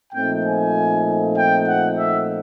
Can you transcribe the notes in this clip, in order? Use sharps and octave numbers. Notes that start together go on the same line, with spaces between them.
A#2 F3 A3 C4 D#4 G5
G#5
G5
F#5
E5